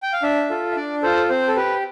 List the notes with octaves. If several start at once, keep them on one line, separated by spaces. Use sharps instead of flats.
G5
F5
D4 E5
F4 A4
E5
D4 D5
F4 A4 C5
C4 C5
A4
G4 B4